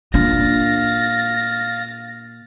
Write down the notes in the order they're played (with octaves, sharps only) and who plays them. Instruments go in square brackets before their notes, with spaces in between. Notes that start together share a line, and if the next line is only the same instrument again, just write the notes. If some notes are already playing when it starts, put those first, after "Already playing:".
[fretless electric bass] A#2 [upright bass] D4 [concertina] F5 [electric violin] A6 A#6